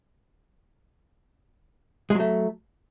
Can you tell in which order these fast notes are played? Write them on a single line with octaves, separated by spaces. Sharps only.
G#3 F#3 A3